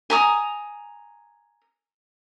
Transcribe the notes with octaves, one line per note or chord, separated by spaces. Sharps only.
G#5 A#5 D#6